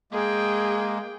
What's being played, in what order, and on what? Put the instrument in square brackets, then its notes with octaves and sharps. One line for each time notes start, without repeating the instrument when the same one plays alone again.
[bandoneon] G#3 A#3 [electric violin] G#4 G5